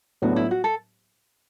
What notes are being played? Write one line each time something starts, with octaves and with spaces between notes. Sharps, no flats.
A2 F#3 B3 D4 F#4
E4
F#4
A4